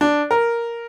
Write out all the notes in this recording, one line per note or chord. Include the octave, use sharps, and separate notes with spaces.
D4
A#4